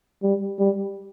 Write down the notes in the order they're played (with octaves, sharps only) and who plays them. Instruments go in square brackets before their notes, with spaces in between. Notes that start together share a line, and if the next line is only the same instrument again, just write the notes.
[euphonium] G3
G3